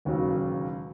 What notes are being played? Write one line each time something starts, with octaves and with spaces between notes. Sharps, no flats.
E1 D#2 C#3 F#3